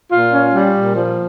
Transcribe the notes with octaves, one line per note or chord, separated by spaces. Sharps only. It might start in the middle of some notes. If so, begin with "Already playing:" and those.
A#2 F4
C#4
G3
A#2
F3